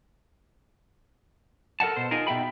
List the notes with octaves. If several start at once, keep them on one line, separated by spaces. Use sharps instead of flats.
A4 A#4 D#5 F#5 A5
B2 C5
D#4 F4 G#4 A#4
B2 E5 G5 B5